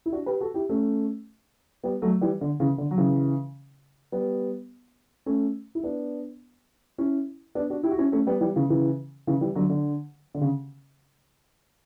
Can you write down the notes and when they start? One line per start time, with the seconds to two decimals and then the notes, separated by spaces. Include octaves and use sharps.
0.06 E4
0.12 D4 F#4
0.26 G4 B4
0.40 F#4 A4
0.54 E4 G4
0.69 A3 C#4
1.83 G3 B3
2.02 F#3 A3
2.21 E3 G3
2.41 D3
2.60 C#3 E3
2.78 D3
2.91 F#3
2.98 C#3 E3
4.12 G3 B3
5.26 A3 C#4
5.75 E4
5.84 B3 D4
6.98 C#4 E4
7.55 B3 D4
7.70 D4 F#4
7.83 E4 G4
7.91 F#4
7.98 C#4 E4
8.12 A3 C#4
8.27 G3 B3
8.41 E3 G3
8.56 C#3 E3
8.70 C#3 E3
9.27 C#3 E3
9.41 E3 G3
9.55 D3 F#3
9.70 D3
10.35 D3
10.41 C#3